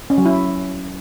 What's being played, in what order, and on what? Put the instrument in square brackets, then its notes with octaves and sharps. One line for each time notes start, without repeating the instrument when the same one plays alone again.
[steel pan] C#4
F#3
E4